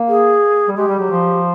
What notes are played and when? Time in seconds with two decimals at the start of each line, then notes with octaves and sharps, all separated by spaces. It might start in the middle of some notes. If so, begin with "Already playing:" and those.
Already playing: A#3
0.09 G#4
0.68 G3
0.77 G#3 G4
0.88 G3
0.99 F#3
1.10 F3